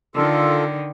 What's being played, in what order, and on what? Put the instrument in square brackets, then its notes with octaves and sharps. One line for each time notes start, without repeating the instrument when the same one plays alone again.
[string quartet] D3 D#3 [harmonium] F4 A4